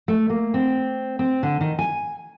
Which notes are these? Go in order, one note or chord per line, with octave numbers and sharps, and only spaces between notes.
A3
A#3
C4
C4
D3
D#3
G#5